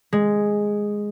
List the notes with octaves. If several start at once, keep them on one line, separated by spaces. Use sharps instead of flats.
G#3